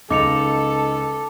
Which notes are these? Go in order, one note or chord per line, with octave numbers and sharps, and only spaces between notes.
C#2 D#4 A4 D6 C#7 F7